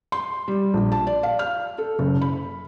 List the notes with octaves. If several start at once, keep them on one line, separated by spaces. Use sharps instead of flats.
C6
G3
A#1
A5
D5
F5
F6
A4
F#1
B5